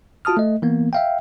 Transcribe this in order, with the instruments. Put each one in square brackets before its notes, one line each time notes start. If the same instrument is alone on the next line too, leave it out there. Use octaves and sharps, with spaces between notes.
[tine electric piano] F4 F#4 A5 D#6 F6
A3 D#5
E3 A#3 B3
E5 F5 G5